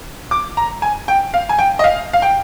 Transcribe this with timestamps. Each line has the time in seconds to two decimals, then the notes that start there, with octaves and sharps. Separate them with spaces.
0.31 D6
0.57 A#5
0.82 G#5
1.08 G5
1.34 F5
1.49 G#5
1.59 G5
1.79 D#5
1.84 F5
2.13 F5
2.22 G5